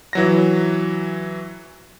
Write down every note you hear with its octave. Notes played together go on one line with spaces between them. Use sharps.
E3 F#3 A#6